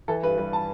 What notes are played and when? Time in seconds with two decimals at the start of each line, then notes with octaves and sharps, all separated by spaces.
0.08 E3 A4
0.23 G2 B4
0.38 G3 B4
0.53 A5